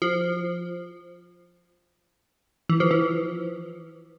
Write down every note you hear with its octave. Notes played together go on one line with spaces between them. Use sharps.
F3
E3
F3
E3